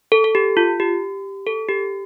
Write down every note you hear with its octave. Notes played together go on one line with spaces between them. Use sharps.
A4
A4
G4
F4
G4
A4
G4